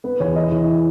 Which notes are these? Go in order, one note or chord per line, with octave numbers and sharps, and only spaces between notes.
B3 B4
E2 C#5
E3 D#5
E3